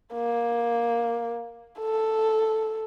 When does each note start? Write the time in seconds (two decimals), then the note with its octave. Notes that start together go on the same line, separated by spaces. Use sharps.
0.13 A#3
1.79 A4